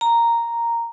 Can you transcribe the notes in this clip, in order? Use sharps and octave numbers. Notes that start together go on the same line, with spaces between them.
A#5